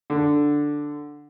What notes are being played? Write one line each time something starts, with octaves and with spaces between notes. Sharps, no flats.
D3